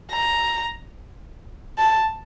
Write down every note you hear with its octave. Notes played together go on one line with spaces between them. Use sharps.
A#5
A5